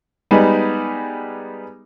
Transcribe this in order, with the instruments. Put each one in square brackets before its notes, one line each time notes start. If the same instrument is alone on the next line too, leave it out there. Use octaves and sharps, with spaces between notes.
[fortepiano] G3 G#3 B3 D#4